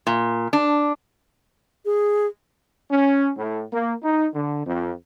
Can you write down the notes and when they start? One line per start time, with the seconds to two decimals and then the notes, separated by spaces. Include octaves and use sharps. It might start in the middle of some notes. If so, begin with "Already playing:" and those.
0.07 A#2
0.53 D4
1.85 G#4
2.90 C#4
3.38 A2
3.73 A#3
4.02 D#4
4.34 D3
4.66 F2